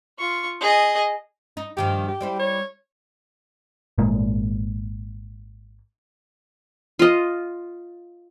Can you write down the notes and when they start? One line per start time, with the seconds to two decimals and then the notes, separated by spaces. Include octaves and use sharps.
0.19 F4 C#6
0.61 G#4 D#5
1.57 D#4
1.77 G2 D#3 F3 G4
2.08 G4
2.21 G3 C4 E4
2.39 C#5
3.98 G#1 A#2 G#3 A#3
6.99 F4 D#5